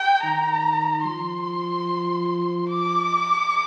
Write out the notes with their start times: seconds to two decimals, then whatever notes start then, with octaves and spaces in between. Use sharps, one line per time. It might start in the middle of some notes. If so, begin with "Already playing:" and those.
Already playing: G5
0.23 D#3 A#5
1.05 F3 C6
2.69 D6